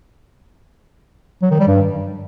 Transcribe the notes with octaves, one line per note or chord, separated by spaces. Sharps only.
F#3
D#3
G3
G2